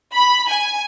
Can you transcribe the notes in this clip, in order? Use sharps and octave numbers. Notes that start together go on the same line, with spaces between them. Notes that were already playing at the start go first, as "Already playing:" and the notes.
B5
G#5